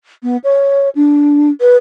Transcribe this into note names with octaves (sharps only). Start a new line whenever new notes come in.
B3
C#5
D4
B4